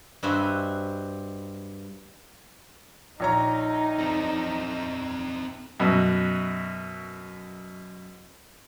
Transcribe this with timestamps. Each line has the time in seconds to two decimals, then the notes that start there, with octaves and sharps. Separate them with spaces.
0.23 G2 C4 F#4 D#5 E5 G#5
3.20 A#1 D#4 C#5 A#5
3.99 C4 A4
5.80 F#2 B2